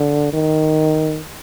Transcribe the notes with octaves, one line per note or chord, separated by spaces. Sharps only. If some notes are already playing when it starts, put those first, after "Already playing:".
Already playing: D3
D#3